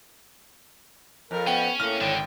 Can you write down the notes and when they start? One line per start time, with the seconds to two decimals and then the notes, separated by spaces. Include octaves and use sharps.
1.31 F2 A#4
1.47 B3 C#4 G5
1.80 A2 A#3 F6
2.01 G#1 D3 G5